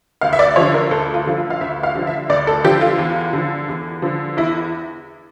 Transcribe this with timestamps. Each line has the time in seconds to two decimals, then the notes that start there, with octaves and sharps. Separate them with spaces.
0.21 D2 F5
0.33 E5
0.39 D5
0.56 D3 F3 C#5
0.74 A#4
0.91 D2 A4
1.14 F4
1.26 D3 F3
1.37 F4
1.50 F5
1.61 D2 E5
1.83 F5
1.95 D3 F3
2.07 E5
2.29 D2 D5
2.47 A4
2.64 D3 F3 G4
2.81 F4
2.98 E2
3.33 D3 F3
3.68 E2
4.02 D3 F3
4.37 E2 E4